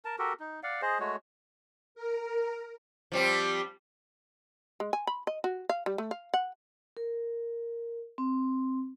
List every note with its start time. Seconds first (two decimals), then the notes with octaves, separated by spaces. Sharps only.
0.05 A#4 A5
0.19 F#4 G4 A4 A#4
0.40 D#4
0.63 D5 F5 F#5
0.82 G#4 C5 D#5
1.00 G#3 A3 F#4 C#5
1.95 A#4
3.12 F3 G3 C4
4.80 G#3
4.93 G#5
5.07 B5
5.27 D#5
5.44 F#4
5.69 F5
5.86 G3
5.98 A3
6.11 F5
6.34 F#5
6.97 A#4
8.18 C4